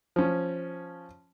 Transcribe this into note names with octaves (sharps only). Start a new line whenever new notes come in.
F3 C#4